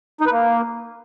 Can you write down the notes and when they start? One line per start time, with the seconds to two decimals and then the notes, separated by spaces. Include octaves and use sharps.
0.21 D#4
0.26 B4
0.32 A#3